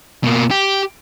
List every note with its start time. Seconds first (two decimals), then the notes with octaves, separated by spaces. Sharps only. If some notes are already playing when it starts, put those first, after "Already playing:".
0.24 B2 A#3
0.51 G4